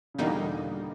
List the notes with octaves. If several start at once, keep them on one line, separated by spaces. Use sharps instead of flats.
C#3
E2 B2 D3 G3 A#3 D#4